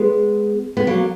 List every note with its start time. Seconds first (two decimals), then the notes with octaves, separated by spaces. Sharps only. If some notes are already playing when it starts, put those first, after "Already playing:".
Already playing: G#3 B3
0.77 B3
0.87 F#3 A#3